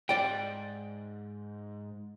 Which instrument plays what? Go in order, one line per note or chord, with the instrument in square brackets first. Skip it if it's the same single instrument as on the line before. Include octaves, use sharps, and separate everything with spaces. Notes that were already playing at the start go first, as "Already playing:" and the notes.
[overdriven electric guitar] G#2 [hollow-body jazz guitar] D5 G5